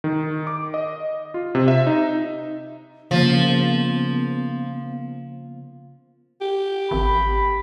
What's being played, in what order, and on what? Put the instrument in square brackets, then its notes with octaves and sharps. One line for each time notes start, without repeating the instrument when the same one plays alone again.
[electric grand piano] D#3
D6
D#5
F4
C3
E5
D#4
[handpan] C#3 A#3 [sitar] F3 [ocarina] B3
[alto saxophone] G4
[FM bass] G#1 [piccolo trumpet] B5